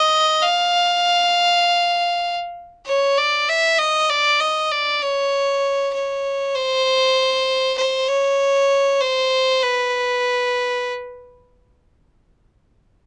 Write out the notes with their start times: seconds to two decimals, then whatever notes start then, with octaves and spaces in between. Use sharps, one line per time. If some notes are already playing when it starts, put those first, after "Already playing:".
Already playing: D#5
0.42 F5
2.86 C#5
3.18 D5
3.49 E5
3.79 D#5
4.10 D5
4.40 D#5
4.72 D5
5.02 C#5
5.93 C#5
6.55 C5
7.78 C5
8.09 C#5
9.01 C5
9.63 B4